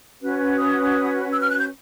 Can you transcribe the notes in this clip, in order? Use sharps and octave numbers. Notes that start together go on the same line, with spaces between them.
C#4 F#4 B4
D#6
E6
F6
F#6
G6